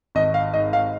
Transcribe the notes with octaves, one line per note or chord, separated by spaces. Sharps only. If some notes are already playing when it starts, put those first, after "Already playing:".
G#1 D#5
F5
G#2 D#5
F5